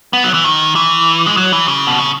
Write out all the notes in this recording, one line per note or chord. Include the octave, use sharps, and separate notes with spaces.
B3
F#3
E3
D#3
E3
G#3
F#3
E3
C#3
B2
C#3